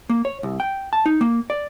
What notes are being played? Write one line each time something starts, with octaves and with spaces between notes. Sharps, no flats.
A#3
C#5
C2
G5
A5
D#4
A#3
D5